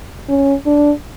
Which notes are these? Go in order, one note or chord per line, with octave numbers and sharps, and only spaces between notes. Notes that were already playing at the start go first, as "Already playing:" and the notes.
C#4
D4